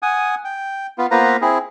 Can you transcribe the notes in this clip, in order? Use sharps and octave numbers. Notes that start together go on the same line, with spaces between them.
F#5 G#5 D#6
G5
B3 F4
A#3 B3 F4 B4 C5 A#5
C4 E4 G#4